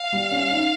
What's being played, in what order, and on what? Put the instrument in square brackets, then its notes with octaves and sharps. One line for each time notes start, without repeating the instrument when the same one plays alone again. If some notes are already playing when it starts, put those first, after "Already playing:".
Already playing: [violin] F5
[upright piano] G3
C#4
D#4